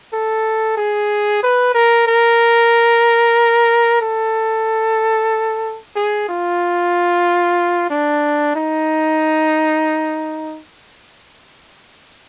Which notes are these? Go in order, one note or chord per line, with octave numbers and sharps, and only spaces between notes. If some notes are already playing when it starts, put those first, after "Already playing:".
A4
G#4
B4
A#4
A#4
A4
G#4
F4
D4
D#4